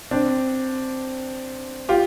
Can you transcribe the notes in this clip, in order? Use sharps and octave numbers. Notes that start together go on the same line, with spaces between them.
C4 D4
F4 G4